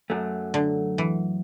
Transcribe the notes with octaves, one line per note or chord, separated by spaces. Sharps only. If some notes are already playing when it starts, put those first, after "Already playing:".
F#2 F#3 A3
D3
E3